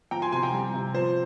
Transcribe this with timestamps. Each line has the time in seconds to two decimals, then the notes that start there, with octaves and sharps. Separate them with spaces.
0.11 F3 G5 A#5
0.22 G#5 C6
0.32 C3 G#5 C6
0.43 G5 A#5
0.53 G3
0.74 C3
0.94 F3 C5